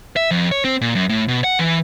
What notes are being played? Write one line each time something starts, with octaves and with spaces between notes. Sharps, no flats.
E5
F2
C#5
C4
A#2
F#2
A2
B2
F#5
E3